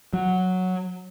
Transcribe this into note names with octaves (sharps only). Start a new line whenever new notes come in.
F#3